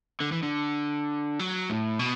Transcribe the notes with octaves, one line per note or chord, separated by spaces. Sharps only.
D3
E3
D3
F#3
A2
B2